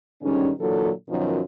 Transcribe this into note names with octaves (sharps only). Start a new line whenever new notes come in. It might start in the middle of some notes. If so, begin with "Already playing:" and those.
G#2 D3 D#3 G3 C#4
A#2 D3 E3 F#3 A4
F#2 B2 D#3 F3 F#3